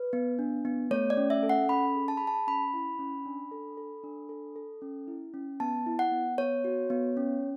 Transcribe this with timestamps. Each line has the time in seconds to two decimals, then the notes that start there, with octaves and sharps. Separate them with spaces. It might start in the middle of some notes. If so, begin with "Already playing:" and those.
Already playing: B4
0.13 B3
0.39 D4
0.65 B3
0.91 A3 C#5
1.10 D5
1.17 C#4
1.30 E5
1.43 A4
1.49 F#5
1.69 C#4 B5
1.96 G#4
2.08 A5
2.17 G#4 B5
2.27 A5
2.47 C#4 B5
2.74 E4
2.99 C#4
3.26 D4
3.52 A4
3.77 A4
4.04 D4
4.29 A4
4.56 A4
4.82 C#4
5.07 E4
5.34 C#4
5.60 B3 A5
5.86 E4
5.99 F#5
6.12 B3
6.38 B3 C#5
6.64 F#4
6.90 B3
7.17 C#4